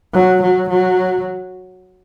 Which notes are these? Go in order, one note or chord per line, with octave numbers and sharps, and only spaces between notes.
F#3
F#3
F#3